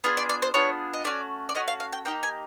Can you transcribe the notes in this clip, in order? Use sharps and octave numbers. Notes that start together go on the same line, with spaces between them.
B3 D4 F4 G#4
D5
D5
C5
B3 D4 F4 G#4 C#5
D#5
A3 C#4 F#4 D5
D5
A3 C#4 F#4 D#5
F5
F5
G5
A#3 D#4 G4 G5
G#5